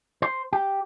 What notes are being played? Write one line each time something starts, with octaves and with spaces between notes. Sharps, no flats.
C5
G4